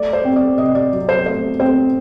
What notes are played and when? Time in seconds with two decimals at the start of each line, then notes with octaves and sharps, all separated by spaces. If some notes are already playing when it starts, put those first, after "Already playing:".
Already playing: A3 D5
0.13 C5
0.25 C4
0.36 D5
0.58 C3 D#5
0.75 D5
0.92 F#3
1.09 C5
1.26 A3 C5
1.60 C4 C5